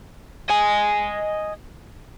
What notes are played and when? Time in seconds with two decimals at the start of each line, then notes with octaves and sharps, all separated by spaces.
0.49 D#5 G#5